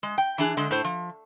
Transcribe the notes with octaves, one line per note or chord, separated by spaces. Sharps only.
G#3
G5
E3 D4 G#4
D3 G#3
A2 C5
F3